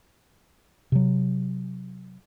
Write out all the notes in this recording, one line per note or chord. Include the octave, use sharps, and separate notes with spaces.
C3 F#3